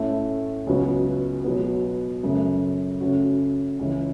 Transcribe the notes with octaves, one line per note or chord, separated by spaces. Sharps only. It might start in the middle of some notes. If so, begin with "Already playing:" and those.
Already playing: A2 A3 C#4 E4
C#2 C#3 F#3 B3 F#4
B2 F#3 B3
F#2 C#3 A3
C#3 A3 C#4 F#4
C#2 C#3 E3